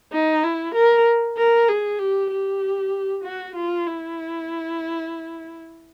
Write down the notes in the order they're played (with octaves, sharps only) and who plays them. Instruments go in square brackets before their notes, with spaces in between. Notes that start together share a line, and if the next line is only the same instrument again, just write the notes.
[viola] D#4
E4
A#4
A#4
G#4
G4
G4
F#4
F4
E4